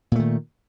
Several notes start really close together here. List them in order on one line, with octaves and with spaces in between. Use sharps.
A#2 A3 D#3